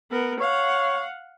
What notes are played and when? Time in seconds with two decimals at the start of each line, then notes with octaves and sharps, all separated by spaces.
0.11 B3 A#4
0.41 C#5 F5 F#5